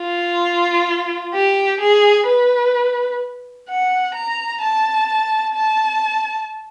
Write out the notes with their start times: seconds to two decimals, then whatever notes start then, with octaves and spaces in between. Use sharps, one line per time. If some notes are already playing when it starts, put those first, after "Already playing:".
Already playing: F4
1.33 G4
1.80 G#4
2.27 B4
3.68 F#5
4.14 A#5
4.61 A5
5.55 A5